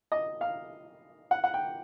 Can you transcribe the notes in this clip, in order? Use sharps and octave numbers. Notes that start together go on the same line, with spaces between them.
D#5
F5
F#5
F#5
G5